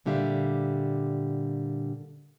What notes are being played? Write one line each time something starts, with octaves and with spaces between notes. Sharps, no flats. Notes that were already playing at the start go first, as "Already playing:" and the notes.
A#2 D3 G3 G4 E5 F5